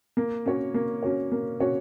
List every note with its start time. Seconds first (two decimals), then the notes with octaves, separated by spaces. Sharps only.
0.17 A#3
0.46 C#4 F#4 C#5
0.74 A#3
1.03 C#4 F#4 C#5
1.32 A#3
1.60 C#4 F#4 C#5